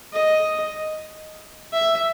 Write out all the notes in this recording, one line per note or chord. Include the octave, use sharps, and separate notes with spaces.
D#5
E5